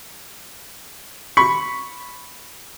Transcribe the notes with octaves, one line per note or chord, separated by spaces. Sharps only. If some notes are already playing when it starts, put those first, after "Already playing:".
B5 C#6